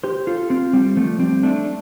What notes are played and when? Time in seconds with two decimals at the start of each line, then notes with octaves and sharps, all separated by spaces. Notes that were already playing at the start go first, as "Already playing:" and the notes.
0.04 G4 C5
0.27 F4 A4
0.50 C4 F4
0.73 G3 C4
0.96 F3 A3
1.20 G3 C4
1.43 A3 D4